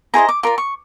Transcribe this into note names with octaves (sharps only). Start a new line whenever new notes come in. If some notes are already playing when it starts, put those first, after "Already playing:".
E4 G#4 C5 D#5 A#5
D6
F4 A#4 D5 D6
C#6